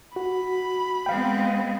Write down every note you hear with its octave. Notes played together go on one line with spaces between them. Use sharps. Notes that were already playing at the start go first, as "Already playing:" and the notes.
F#4 B5
G#3 B3 C4 F5 G5